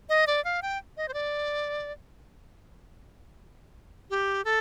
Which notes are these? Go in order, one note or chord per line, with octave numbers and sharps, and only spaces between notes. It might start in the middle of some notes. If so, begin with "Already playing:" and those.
D#5
D5
F5
G5
D#5
C5
D5
G4
A4